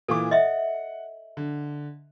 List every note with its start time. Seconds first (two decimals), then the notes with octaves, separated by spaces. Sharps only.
0.08 A#2 E3 A4 D6
0.31 D#5 E5 F#5
1.37 D3